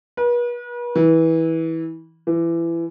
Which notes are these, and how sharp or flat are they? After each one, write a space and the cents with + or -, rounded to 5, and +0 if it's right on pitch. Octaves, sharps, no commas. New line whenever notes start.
B4 -40
E3 -20
E3 +25